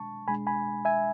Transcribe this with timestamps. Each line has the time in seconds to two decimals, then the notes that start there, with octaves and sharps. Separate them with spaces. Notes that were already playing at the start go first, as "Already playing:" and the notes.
Already playing: B2 G#3 D4 A5 C#6
0.28 B2 G#3 D4 G#5 B5
0.47 G#5 B5
0.85 E5 G#5